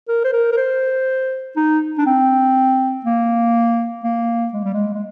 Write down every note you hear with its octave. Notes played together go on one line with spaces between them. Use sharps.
A#4
C5
A#4
A#4
C5
D#4
D4
C4
A#3
A#3
G#3
G3
G#3
G#3